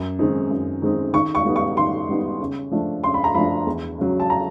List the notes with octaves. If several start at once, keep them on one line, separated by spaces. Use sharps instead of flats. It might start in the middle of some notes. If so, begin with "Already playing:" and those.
Already playing: F#2
D#3 G#3 C4 D#4
F#2
D#3 G#3 C4 D#4
D#3 C#6
C#6
G3 B3 D#4
C#6
D#3 C6
G3 B3 D#4
C#3
F3 A3 D4
C#3 C6
B5
A#5
F3 A3 D4 B5
E2
C#3 F#3
A5
A#5